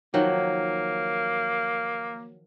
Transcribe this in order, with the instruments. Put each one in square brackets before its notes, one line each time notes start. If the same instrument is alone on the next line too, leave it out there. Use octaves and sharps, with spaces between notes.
[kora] D#3 F3 F#3 [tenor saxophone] A#3